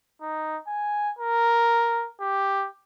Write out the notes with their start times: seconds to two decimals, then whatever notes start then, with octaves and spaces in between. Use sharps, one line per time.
0.21 D#4
0.67 G#5
1.19 A#4
2.20 G4